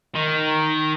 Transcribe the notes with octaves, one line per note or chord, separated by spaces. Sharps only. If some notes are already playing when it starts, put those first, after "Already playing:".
D#3